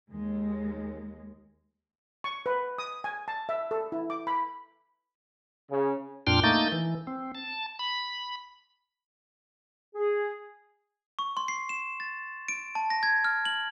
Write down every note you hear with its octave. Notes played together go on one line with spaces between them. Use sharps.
D#2 G#3
C#6
B4
D#6
G#5
A5
E5
A4
E4
D6
B5
C#3
F2 A#2 D4 G5 C6 F6
A3 A#3 D#4 G6 A6
E3
C4
A5
B5
G#4
C#6
C6
C7
E7
A6
D7
A5
A#6
G#6
F6
F#7